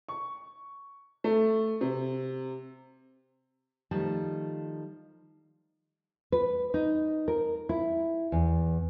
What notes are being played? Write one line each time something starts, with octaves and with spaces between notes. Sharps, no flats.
C#6
A3
C3
D#3 F3 G3 A3 A5
B4
D#4
A#4
E4
E2